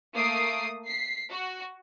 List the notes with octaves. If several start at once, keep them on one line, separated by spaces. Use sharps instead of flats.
A3 A#3 D#6 C7 D7
B6 C7
F#4